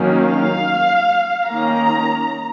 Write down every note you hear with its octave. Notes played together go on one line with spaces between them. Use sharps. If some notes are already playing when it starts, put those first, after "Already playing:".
Already playing: D#3 F#3 A#3 C#4
F5
D#3 A#3 C#4 A#5